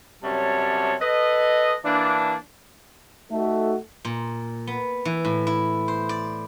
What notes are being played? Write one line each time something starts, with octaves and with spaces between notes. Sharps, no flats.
F#2 C3 G3 C#5 A5
A4 B4 D#5
E3 A#3 D4
A3 D#4 F#4 A4
A#2
B3
E3
A2
E4
C5
D5